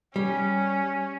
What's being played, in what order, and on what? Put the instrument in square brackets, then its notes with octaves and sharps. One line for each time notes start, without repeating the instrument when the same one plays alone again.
[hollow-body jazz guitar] G3 [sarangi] C#4